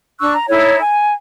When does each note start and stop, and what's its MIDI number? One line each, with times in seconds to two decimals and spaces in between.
0.20 0.34 62
0.20 0.34 85
0.20 0.34 88
0.20 0.34 90
0.35 0.45 82
0.49 0.79 63
0.49 0.79 64
0.49 0.79 69
0.49 0.79 73
0.80 1.13 80